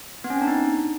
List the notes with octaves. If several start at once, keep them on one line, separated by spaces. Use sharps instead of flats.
B3
C#4
C4
D4
D#4